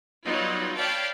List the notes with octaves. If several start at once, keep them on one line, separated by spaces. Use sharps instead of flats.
F#3 G3 B3 D#4 F4
C#5 D5 F5 G5 A5 B5